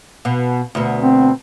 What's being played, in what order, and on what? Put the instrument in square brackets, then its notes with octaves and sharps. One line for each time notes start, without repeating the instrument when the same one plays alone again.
[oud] B2
D2 B2
[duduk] C4